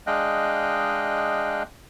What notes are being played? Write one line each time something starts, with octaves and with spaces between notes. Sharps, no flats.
G#3 D4 D#5 F5 G5 F#6